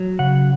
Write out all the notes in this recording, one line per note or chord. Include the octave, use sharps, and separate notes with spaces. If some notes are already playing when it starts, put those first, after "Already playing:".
Already playing: F#3
C#3 F#5